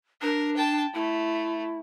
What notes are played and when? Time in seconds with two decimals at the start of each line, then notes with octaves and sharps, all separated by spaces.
0.22 D4 A#4
0.57 G5 A5
0.95 A3 E4